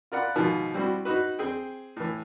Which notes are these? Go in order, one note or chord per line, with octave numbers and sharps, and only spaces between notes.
F4 A#4 D5 F#5 B5
G#2 B2 D#3 F3
G3 C4 E4 F#4
D#4 F#4 B4
C4 G#4 G5
A2 E3